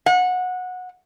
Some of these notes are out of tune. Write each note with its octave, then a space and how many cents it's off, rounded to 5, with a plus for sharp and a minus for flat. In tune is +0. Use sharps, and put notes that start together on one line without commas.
F#5 -20